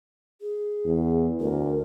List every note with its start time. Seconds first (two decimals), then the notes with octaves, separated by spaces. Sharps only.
0.41 G#4
0.86 E2
1.40 D2 A#4